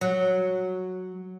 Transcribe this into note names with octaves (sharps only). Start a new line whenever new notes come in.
F#3